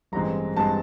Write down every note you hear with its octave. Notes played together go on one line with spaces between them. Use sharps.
A1 G2 E3 G#3 C4 A#5
G2 E3 G#3 C4 A5